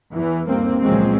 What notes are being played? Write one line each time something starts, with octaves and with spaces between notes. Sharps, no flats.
E2 E3
G1 D#2 A#3 C4
C#2 A#2 F3 F#3 G#3 C4